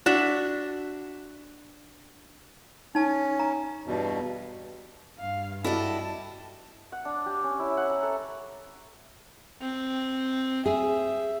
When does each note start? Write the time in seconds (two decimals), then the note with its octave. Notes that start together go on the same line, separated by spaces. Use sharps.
0.06 D4 F#4 E5
2.95 C#4 D#4 A5
3.39 A#5
3.86 E2 G2 B2
5.20 G2 F5
5.64 E4 F#4 G4 A4 D5 D#5 A5
6.92 F#5
7.05 D4
7.26 G4
7.44 C#4
7.59 E4
7.77 F#5
7.90 A#5
8.03 A4
9.61 C4
10.66 G#4 E5